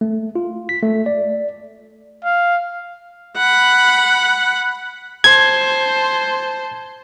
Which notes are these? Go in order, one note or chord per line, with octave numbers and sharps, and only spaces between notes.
A3
F4
B6
A3
D5
F5
F#5 B5
C5 A5 G#6